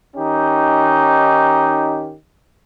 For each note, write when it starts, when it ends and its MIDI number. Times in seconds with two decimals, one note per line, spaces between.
0.16 2.14 51
0.16 2.14 61
0.16 2.14 63
0.16 2.14 67